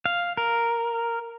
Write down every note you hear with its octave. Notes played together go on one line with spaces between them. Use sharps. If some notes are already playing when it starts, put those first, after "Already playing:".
F5
A#4